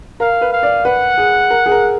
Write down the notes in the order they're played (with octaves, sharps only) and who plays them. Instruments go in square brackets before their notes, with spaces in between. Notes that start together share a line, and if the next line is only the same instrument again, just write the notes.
[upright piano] A#4 [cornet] F5
[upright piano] B4
[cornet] F5
[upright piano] D5
[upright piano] B4 [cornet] F#5
[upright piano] G#4
A#4
G#4
A#4